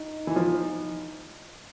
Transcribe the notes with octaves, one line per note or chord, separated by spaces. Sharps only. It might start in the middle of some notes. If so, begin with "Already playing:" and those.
Already playing: D#4
E3
F3